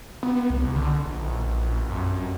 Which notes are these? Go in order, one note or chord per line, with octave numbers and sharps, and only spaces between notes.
B3
C2
D3
A#1
F#2